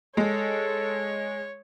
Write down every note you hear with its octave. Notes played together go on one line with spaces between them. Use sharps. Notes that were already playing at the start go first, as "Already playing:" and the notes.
G#3 A4 C#5